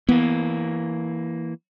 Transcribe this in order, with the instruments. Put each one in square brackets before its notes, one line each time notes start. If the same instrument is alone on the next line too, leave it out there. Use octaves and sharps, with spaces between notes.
[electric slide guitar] E3 A#3 [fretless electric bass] B3